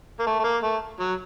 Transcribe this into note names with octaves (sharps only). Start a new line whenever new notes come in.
A#3
A3
A3
A#3
A3
F#3